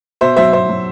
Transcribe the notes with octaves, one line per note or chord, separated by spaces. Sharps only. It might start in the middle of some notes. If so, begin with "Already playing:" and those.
B2 C5 E5
F#3 C5 E5
B2 C5 E5
F#3